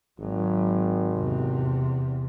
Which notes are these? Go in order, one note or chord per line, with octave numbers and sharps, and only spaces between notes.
G#1 F#3
E2 C3